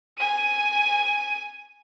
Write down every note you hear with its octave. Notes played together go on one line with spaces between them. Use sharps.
G#5 D#7